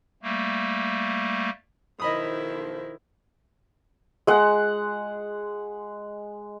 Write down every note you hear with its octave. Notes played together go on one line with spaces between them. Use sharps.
G3 A3 A#3
B1 D#3 F3 E4 C5 D#5 B5 D#6
G#3 F#5